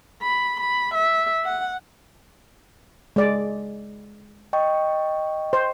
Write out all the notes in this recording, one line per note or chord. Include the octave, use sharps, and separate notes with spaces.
B5
B5
E5
F#5
G#3 D5
D#5 G5 C#6
C5